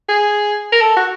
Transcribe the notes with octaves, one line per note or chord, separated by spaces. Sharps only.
G#4
A#4
A4
F#4